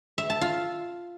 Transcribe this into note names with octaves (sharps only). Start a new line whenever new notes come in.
E5
A5
F4